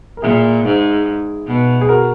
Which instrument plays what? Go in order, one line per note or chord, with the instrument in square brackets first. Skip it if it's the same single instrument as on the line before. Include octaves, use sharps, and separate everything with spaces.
[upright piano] A#4
[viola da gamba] A#2 [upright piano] E4 G#4
[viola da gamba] G#2
B2
[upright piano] G#4
F#4 A#4